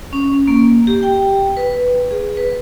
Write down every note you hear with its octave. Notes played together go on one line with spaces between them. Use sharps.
C#4
A#3
G4
G5
B4
G#4
B4